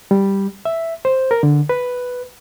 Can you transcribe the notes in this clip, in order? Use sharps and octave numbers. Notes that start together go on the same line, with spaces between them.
G3
E5
C5
A#4
D3
B4